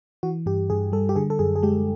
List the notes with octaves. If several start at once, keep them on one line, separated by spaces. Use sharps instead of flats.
E3 F#4
G2 G4
G2 G#4
G3 A4
G4
D3 G#4
A4
F#2 G#4
G#4
G#3 G4